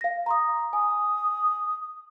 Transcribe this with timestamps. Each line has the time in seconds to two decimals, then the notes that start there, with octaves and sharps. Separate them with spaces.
0.01 F5 A#6
0.26 A#5 C6 D#6
0.73 G#5 D#6